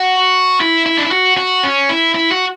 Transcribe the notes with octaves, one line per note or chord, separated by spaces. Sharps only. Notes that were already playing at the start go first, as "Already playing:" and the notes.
Already playing: F#4
E4
E4
D4
E4
F#4
F#4
C#4
E4
E4
F#4